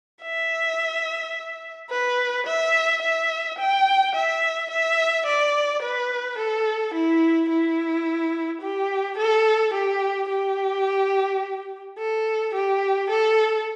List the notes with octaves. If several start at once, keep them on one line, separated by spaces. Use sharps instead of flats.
E5
B4
E5
E5
G5
E5
E5
D5
B4
A4
E4
E4
G4
A4
G4
G4
A4
G4
A4